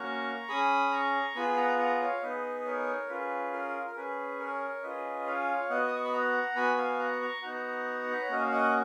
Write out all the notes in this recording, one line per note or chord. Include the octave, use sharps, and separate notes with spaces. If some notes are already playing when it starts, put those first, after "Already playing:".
Already playing: A#3 C#4 F#4 A#5 C#6
C#4 G#4 B5 D#6
A#5 C#6
B3 F4 G#4 G#5 B5
F#5 A#5
F#5 A#5
C#5 F5
B3 D#4 G#4 B4 D#5
A#4 C#5
C#4 F4 G#4 B4
A#4
A#4
C#4 G#4 B4
A#4 C#5
C#4 F4 G#4 B4 D#5
C#5 F5
B3 F#4 D#5 F#5
D#6
C#6
B5
F#5 A#5
B3 F#4 G#5 B5
F5 G#5
F#5 A#5
A#5 C#6
B3 D#4 F#4 F#5 A#5
B4
C#5
A#3 C#4 F#4 D#5
F5
D#5 F#5